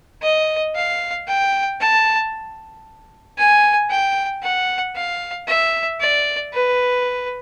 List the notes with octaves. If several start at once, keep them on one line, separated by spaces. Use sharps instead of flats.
D#5
F5
G5
A5
G#5
G5
F#5
F5
E5
D5
B4